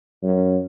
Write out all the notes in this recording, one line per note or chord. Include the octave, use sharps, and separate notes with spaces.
F#2